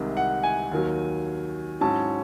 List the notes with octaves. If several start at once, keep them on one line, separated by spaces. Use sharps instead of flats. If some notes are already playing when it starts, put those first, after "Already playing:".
Already playing: C2 C3 D#3 G#3
F#5
G#5
D#2 D#3 F#3
G#2 F#3 C#4 E4 A5